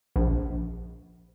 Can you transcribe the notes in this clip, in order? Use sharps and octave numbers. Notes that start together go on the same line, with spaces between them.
A#1